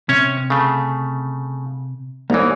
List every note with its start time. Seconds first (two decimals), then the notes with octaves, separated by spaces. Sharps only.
0.09 C3 C#4 C#5
0.50 C#3 A3
2.30 C2 E3 A#3 D#4 C#5